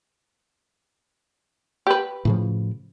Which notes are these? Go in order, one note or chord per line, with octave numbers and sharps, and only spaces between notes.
G4 B4
A2 C#3 F3